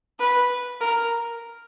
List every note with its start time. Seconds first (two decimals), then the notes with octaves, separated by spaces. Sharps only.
0.20 B4
0.81 A#4